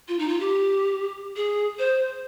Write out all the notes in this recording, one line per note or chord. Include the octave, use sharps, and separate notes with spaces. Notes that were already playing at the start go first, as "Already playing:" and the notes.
F4
D#4
F4
G4
G#4
C5